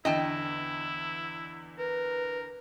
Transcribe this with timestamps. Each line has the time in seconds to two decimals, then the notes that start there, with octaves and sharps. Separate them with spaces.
0.05 E2 D3 E4 D#5 G5 A5
1.78 A#4 B4